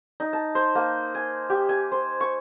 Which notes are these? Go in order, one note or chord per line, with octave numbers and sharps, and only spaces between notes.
D#4
A5
C5
A#3
G#5
G4
G#5
C5
C#6